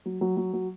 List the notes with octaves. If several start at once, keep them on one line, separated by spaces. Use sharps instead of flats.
F#3
F#3
F#3
F#3